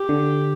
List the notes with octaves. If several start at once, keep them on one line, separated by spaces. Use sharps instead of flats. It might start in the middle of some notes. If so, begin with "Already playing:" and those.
Already playing: G4
D3